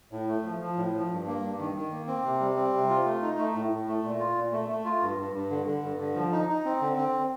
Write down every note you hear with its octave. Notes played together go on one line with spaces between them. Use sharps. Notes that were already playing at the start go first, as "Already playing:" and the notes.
A2
A3
F3
F3
A2
F3
G2
A#3
G2
D#3
D#3
A#3
C4
C3
G3
C4
C3
F4
A3
D#4
A3
A2
A2
A3
A#2
F4
A#2
A3
A3
F4
G2
G2
G2
D3
D3
G2
D3
F3
D#4
D#4
C4
D3
C4